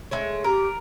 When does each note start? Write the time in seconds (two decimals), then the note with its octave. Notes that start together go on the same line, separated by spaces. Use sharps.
0.11 G#3 A3 C#5
0.44 G4 A#4